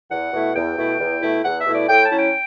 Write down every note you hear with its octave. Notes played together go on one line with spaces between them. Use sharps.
E2 F#5
B2 A3 E4
E2 G5
B2 A3 E4
E2
B2 A3 E4
E2 F#5
E5
B2 A3 E4
D5
A2 G5
A5
F#3 C#4 E4
G5